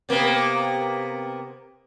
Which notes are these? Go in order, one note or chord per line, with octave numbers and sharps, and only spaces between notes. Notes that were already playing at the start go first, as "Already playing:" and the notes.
C3 A#3 B3